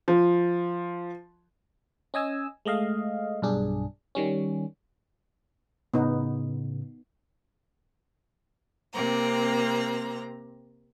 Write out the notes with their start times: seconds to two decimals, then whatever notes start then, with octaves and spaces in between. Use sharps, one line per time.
0.08 F3
2.14 C#4 D#5 G#5 E6
2.65 G#3 A3 D#5 F5
3.42 B1 G2 D4 G#4
4.15 D#3 G3 C#4
5.94 A2 C#3 B3 D#4
8.93 C3 A#3 C4 A#5